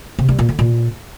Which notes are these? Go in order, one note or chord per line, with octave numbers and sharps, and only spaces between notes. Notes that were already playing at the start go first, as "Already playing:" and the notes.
C3
G3
A#2
D3
A#2